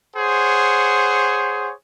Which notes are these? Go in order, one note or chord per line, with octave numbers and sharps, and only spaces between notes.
G#4 C5 C#5 F#5